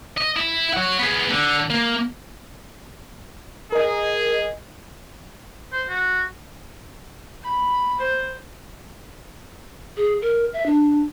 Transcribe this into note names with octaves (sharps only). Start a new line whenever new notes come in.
D#5
E4
C#5 F#5
B3 G#4
D3
A#3
G#4 A#4 D#5
C5
F#4
B5
C5
G#4
A#4
E5
D4